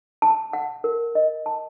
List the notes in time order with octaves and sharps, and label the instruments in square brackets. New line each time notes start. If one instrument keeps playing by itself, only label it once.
[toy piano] A5
F#5
A#4
D#5
A5